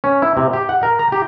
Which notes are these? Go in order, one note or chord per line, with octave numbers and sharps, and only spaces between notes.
C#4
E4
C3
G4
F#5
A#4
A#5
G4